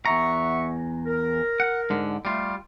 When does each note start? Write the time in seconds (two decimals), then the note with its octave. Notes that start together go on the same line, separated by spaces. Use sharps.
0.06 E2 E5 F#5 A#5 C#6
1.06 A#4
1.60 F#5
1.90 G#2 D3
2.25 G3 A3 F4